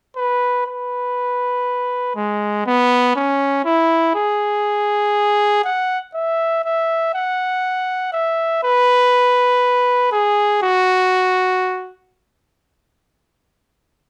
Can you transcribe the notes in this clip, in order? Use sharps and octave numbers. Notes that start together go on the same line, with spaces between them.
B4
B4
G#3
B3
C#4
E4
G#4
F#5
E5
E5
F#5
E5
B4
G#4
F#4